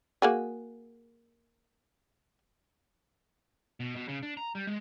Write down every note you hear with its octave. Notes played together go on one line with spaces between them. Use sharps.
A#3 F#4 G#4
B2
B2
C#3
D4
A#5
G3
G#3